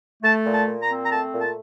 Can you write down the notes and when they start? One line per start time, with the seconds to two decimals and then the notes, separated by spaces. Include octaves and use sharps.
0.23 A3 A5
0.46 A#2
0.53 A5
0.68 A#2
0.82 A#5
0.90 C4
1.04 A#5
1.12 A3 A5
1.33 A#2
1.41 A5